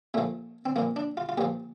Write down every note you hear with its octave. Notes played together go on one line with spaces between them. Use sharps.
A#2 F3 A3
C4
A#2 F3 A#3
D4
F4
F4
A#2 F3 G4